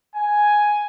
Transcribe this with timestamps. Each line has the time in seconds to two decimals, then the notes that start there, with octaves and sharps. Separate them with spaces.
0.15 G#5